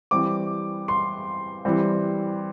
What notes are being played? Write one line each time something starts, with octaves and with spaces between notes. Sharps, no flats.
E3 G3 C4 D6
C6
E3 G3 C4